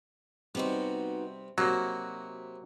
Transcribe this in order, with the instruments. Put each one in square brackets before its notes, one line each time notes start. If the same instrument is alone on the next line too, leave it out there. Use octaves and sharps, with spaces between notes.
[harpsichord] C3 G3 C4 [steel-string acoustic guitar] B3 D#4 F#4
[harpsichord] C3 D#4 [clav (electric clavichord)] F#3 A#3 [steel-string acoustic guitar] F#4